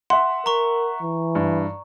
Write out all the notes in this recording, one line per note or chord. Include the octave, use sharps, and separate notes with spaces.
E5 F#5 C6
A#4 A#5 C#6
E3
G2